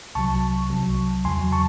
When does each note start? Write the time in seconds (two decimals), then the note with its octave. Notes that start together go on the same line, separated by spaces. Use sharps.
0.15 C2 C3 F#3 A5 C#6
0.70 C2 C3 F#3
1.25 E2 C#3 F#3 G#5 C6
1.52 A5 C#6